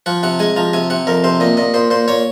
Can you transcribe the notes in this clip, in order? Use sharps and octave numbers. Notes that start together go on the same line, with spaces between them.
F3 F#5
C3 F#5
G#3 G#5
F3 A#5
C3 G#5
C3 F#5
F2 A#4
C3 C5
A#2 D#5
A#2 D#5
A#2 C5
A#2 C5
A#2 C#5